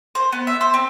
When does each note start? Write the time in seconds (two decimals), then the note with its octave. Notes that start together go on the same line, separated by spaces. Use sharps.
0.15 C5
0.32 B3
0.47 E5
0.61 C5
0.74 C4